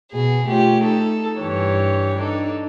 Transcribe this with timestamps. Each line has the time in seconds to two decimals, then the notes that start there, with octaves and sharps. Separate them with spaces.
0.12 B2 G#4
0.47 A3 F4 G4 C#5
0.82 D#4 A4
1.39 G2 E3 G4 C#5
2.18 D4 D#4 A4